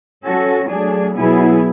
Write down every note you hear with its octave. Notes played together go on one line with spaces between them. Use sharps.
F#3 C#4 F#4 A4
F#3 A3 D4 G#4
B2 F#3 B3 E4 G#4